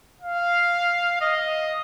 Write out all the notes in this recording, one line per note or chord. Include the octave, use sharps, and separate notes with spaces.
F5
D#5